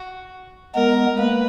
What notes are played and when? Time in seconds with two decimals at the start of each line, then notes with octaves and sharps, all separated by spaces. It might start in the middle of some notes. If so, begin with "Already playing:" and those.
Already playing: F#4
0.74 G#3 B3 A#4
1.18 A#3 B4